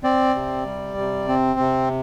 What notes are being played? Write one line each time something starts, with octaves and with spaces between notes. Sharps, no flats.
C4 D5
C3
G3
C3
C4
C3